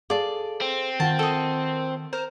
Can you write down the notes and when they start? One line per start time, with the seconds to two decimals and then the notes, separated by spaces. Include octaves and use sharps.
0.10 G#4 A4 D5 F5 A5
0.61 C4
1.00 D#3 F4 F#5 A5
1.19 A4 D#5
2.13 A#4 C5